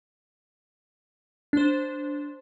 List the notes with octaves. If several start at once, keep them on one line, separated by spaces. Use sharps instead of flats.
D4 C5